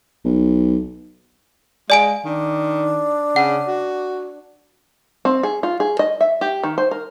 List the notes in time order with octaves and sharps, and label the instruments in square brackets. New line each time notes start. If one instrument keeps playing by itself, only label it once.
[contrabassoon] B1
[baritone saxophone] G#3 [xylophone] D5 G#5 D7 [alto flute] F5
[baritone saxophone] D#3 [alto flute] D4
[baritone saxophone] C#3 [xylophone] F#5
[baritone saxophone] F#4
[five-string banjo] C4
G#4
F4
G#4
D#5
E5
G4
D#3
C5
A#4